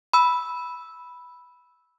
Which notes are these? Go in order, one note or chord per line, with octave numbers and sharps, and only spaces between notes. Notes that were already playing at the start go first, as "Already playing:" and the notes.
B5 E6